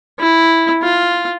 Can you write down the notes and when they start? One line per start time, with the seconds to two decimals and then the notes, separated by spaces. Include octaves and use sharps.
0.20 E4
0.83 F4